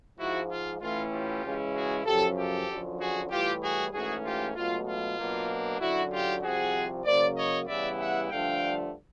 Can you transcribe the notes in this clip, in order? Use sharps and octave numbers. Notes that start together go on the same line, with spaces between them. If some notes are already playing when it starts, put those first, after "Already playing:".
G#2 F3 G#3 E4 F#4
F4
A2 E3 A3 C#4 E4 F4
F4 G4
C#3 E3 G#3 C#4 E4
F#4 G#4
F#2 C#3 F3 G4 A4
G4 A4
F#2 D3 F3
F#4 G#4
A2 E3 G3 F4 G4
F#4 G#4
G#2 E3 A3 C#4 F#4 G#4
F4 G4
C#2 B2 F#3 A3 F4
F4
B2 F#3 A#3 D4
F#2 D3 F#3 E4 F#4
F4 G4
C2 C3 F3 F#4 G#4
C#3 F#3 A#3 C5 D5
C#5 D#5
C#3 E3 G3 B3 E4 D5 E5
E5 F#5
G2 D3 F3 A3 D4 F5 G5